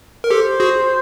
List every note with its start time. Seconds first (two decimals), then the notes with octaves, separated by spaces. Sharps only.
0.24 A#4
0.30 G4 A4 C5
0.60 F#4 G#4